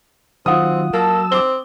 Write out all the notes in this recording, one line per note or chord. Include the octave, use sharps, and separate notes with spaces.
D#3 F#3 C4 F4 F#5 D#6
F#3 A#3 A4 E6
C4 D6 G7